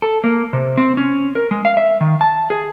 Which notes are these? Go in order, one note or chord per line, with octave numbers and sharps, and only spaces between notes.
A4
A#3
C3
C4
C#4
A#4
G#3
F5
E5
D#3
A5
G#4